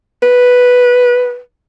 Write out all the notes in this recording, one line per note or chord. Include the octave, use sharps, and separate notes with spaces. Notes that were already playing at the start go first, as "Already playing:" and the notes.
B4